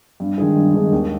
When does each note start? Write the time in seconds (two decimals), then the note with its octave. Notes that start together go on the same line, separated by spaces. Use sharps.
0.20 G2
0.38 D#3 G#3 D4 G#4
0.56 G2
0.74 D#3 G#3 D4 G#4
0.92 D#2